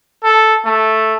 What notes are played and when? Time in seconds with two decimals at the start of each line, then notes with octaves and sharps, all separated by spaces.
0.24 A4
0.65 A3